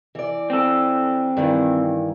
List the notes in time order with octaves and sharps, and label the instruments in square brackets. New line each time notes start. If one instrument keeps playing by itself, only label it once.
[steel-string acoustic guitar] E3 D5
[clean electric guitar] C4 A4
[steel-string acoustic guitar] G2 D#3 E3